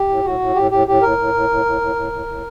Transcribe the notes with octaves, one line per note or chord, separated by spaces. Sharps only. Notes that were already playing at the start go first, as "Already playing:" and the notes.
Already playing: G4
A2
A2 F#4
A2
A2 G4
A2 G4
A2 G4
A2 A#4
A2
A2
A2
A2
A2
A2
A2
A2